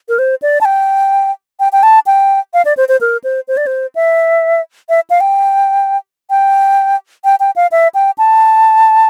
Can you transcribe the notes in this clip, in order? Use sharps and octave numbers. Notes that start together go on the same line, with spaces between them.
A#4
C5
D5
A5
G5
G5
G5
A5
G5
F5
D5
C5
C5
A#4
C5
C5
D5
C5
E5
E5
F5
G5
G5
G5
G5
F5
E5
G5
A5